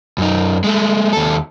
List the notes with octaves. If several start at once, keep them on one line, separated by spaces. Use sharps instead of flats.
F#2 D#4
G#3 A3
D#2 A4